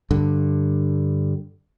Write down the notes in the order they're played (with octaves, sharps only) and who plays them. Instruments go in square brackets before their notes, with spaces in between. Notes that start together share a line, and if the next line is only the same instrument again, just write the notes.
[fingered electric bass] G2 D3